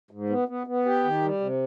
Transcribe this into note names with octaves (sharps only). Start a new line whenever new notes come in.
G#2
B3
B3
B3
G4
D#3
G3
C3